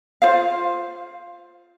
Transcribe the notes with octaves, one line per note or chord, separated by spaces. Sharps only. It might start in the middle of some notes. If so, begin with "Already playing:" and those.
F4 C5 F5